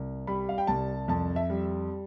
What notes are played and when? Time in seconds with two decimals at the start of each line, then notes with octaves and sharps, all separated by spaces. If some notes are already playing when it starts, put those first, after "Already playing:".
Already playing: C2
0.27 G3 B5
0.49 F5
0.58 G5
0.67 C2 A5
1.08 F2 A5
1.36 E5
1.50 G3